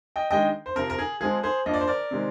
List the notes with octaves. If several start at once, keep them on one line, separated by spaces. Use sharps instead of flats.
D#5 G5
D#3 G#3 D4 D#5 G5
C5
C3 F3 C4 A#4
A#4
G#4
F3 G#3 C4 G#4
G#4 C5
F3 A#3 D4 D#5
D5
C5
A#4 D5
C3 D#3 G#3 C4